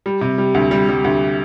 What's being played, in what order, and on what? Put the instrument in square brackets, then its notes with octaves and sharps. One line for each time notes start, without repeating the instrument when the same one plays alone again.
[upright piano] G3
C3
G3
D2
G3
G3
D2